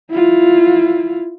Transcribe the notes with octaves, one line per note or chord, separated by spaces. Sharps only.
E4 F4